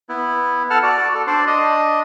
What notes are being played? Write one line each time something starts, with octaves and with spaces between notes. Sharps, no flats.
B3 E4
A4 F#5 A5 F6
F#4 D5
A4
D4 C5 D5
D4 D#5